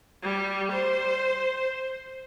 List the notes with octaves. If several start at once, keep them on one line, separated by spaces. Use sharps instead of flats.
G3
C5